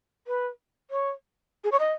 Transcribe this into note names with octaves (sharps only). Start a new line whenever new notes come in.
B4
C#5
G#4
C#5
D#5